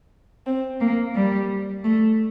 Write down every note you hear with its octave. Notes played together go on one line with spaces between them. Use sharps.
C4
A#3
G3
A3